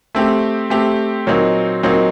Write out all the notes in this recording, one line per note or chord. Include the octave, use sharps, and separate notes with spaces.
A3 C4 G4
A3 C4 G4
A#2 F#3 C4 D#4
A#2 F#3 C4 D#4